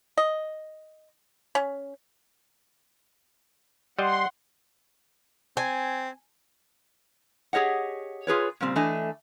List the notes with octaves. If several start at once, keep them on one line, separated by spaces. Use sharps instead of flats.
D#5
C#4
G3 D#5 F#5 C6
C4 G#5
G4 G#4 C#5 D#5 F#5
F4 G#4 B4 C#5
A#2 C#3 G3 C4
E3 A3 D4 D#5 G#5